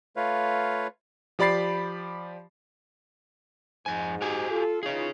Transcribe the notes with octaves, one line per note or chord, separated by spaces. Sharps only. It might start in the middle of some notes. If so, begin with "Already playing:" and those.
A3 F4 B4 C#5 F5
F3 G4 D5 B5 A6 C7
F2 G#2 G#5
F#4 G4 G#5
F4 A4
E3 D#4 F4 G#4 C#5